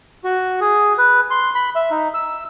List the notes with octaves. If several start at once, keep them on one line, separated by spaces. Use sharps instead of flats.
F#4
G#4
B4
C6
B5
E5
D#4
E6